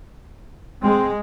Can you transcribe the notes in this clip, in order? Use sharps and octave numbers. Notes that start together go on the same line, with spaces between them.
G#3 C4